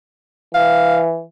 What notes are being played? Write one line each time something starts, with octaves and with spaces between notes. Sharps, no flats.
E3 F5